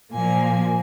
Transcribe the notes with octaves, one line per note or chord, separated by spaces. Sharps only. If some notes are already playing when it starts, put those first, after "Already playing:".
A#2 F3 A#3 G#5